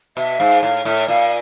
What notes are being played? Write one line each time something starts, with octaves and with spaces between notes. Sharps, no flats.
B2 E5
G#2 F5
A2 F5
A2 E5
A#2 F5